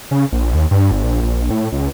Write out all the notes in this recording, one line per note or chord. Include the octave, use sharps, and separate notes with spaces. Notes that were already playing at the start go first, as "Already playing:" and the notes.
C#3
A#1
D#2
G2
G1
A#1
A#1
A2
C#2